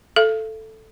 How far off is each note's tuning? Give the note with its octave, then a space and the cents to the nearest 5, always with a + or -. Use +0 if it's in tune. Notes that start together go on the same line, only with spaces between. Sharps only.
A4 +0 F5 -45